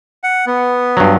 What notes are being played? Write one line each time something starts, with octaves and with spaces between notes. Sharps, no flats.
F#5
B3
G2 F#3